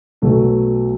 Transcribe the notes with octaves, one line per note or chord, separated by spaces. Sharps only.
B1 B2 F#3 A3